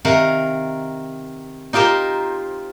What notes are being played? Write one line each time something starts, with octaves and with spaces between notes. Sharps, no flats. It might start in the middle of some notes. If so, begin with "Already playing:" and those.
C3 D#3 A#4 F5 F#5 A#5
D#4 F4 G4 A#4 C5